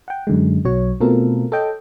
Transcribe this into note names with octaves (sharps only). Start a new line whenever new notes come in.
F#5 G5
F#2 D3 G#3
B1 F#3 C#5
B2 A3 C4 F4 A4 A#4
A4 C#5 D#5 G5